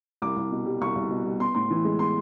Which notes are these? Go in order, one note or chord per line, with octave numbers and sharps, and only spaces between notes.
C2 D6
C2
B2
G3
C2 C#6
C2
B2
G3
B3 C6
A2 C6
E3
G#3
B3 C6